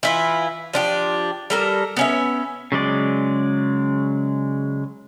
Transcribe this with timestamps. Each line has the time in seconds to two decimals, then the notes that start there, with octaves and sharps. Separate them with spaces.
0.03 E3 E4 F4
0.73 F3 D4 G4
1.50 G3 A4 A#4
1.97 B3 C#4 E5
2.72 C#3 F#3 G#3 D5